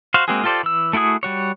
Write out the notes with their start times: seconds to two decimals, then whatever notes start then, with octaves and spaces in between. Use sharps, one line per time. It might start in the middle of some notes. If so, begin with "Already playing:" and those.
0.14 F#4 C5 F5
0.28 G#3 A#3 C4 F#4 G#4
0.44 F4 G4 A4 C5 D5
0.63 E3 E6
0.93 A3 E4 F#4 G#4 D#6
1.23 G3 F#4 C#5